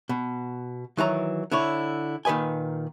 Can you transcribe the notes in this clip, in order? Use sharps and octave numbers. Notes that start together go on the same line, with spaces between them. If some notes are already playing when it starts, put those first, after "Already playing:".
B2
D#3 E3 F#3 A#5
D3 E4 C#5
A#2 D#3 B4 D#5 G#5